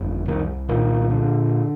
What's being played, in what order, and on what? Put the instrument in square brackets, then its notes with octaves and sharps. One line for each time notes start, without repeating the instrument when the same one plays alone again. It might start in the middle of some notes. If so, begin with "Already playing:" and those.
Already playing: [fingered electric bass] G1 F2
C2 D#3
A#2 D#3
D3